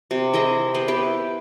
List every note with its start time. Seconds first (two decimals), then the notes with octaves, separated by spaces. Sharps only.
0.11 C3
0.33 E4 G#4 D#5 E5
0.74 B3 G4 B4 C5
0.88 E4 G4 B4